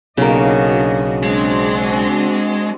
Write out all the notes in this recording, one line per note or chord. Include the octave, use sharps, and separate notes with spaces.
B1 C#3 A#3 D4 F#4 D#5
G#3 C4 D4 F#4